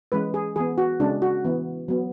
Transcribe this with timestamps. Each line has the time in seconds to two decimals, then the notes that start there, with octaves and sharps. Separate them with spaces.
0.12 E3 G#3 C#4 B4
0.34 G#4
0.56 E3 B3 G#4
0.78 F#4
1.00 C#3 G#3 C#4 D4
1.22 F#4
1.45 E3 B3
1.88 F#3 B3